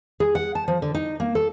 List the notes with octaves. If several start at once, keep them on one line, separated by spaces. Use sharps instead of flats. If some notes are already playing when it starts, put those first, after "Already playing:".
G#4
F#5
A5
F3
D3
D#4
A#3
A4